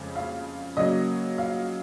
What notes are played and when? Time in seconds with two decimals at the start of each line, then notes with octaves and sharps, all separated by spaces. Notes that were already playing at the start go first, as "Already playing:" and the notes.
Already playing: F2 C#3 G#3
0.15 F5
0.77 C#3 F#3 A#3 D#5
1.38 F5